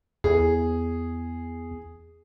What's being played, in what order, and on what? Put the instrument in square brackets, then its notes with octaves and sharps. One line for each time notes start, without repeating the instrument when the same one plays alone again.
[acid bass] E2 [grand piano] G#4